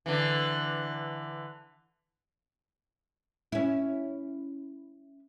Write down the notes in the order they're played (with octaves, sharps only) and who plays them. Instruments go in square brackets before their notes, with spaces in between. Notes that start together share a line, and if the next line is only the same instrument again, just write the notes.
[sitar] D3 E3
[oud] C#4 E4